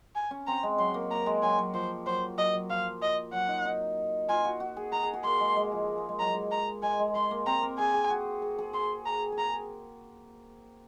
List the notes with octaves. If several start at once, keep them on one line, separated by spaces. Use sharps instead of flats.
G#5
C#4
C4 A#5
G#3
F#3 C6
A#3
A#3 A#5
G#3
F#3 G#5
F#3
F3 C5
F#3 C5
F#3 D#5
F#3
F3 F5
D#5
F#3 F#5
D#4
D#4
F4 G#5
F#4
F#4
G#4
A#4 A#5
G#4
F#4
A#3 C6
G#3
G#3
F3
A#3
G#3
F#3 A#5
G#3
A#5
G#3 G#5
G#3
G#3 C6
A#3
C4 A#5
A#4
G#4 G#5
G#4
F#4
G#4
G#4
G#4 C6
A#5
G#4
A#4 A#5